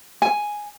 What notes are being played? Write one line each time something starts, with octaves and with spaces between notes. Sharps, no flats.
G#5